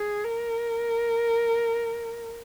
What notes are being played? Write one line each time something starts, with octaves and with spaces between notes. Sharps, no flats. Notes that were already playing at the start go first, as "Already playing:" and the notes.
Already playing: G#4
A#4